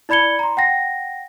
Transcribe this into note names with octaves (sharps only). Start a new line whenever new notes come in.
E4 D5 B5 G#6 C#7 G7
A#5 C6
F#5 G5 A#6